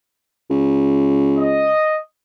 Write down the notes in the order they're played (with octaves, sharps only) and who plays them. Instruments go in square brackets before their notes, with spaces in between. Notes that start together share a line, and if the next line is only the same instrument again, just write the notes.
[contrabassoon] C#2
[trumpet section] D#5